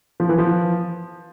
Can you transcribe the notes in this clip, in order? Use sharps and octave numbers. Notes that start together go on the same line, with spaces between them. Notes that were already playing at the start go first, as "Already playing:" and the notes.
F3
E3
F3